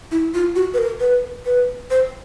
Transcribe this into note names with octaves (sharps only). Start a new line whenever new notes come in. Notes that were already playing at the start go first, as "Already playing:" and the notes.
E4
F4
F#4
B4
A#4
B4
B4
C5